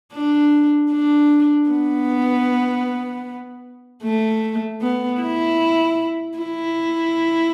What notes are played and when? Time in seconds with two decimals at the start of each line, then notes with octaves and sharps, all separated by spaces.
0.13 D4
0.91 D4
1.70 B3
4.03 A3
4.82 B3
5.21 E4
6.38 E4